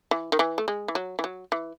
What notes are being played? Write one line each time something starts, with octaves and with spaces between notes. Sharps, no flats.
E3
D#3
E3
A3
G#3
E3
F#3
E3
F#3
E3